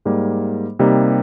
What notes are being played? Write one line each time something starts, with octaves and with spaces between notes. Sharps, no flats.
G#2 G3 A#3
C3 G3 A#3 D#4